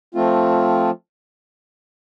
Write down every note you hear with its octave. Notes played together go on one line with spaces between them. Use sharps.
F3 A3 C4 F4